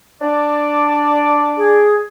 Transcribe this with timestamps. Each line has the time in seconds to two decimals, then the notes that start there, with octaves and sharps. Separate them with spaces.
0.21 D4 D5
1.57 G#4